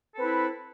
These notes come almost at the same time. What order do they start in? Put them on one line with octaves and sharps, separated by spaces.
A4 C4 B4 E4